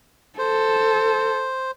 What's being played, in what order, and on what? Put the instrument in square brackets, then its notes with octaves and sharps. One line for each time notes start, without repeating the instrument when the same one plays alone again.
[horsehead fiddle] A4 [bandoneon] C5